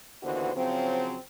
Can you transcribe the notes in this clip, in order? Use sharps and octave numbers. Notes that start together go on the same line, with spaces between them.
D#2 D3 E3 B3 F#4 C5
C#3 F3 F#3 C4